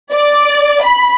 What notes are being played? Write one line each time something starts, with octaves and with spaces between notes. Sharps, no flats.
D5
B5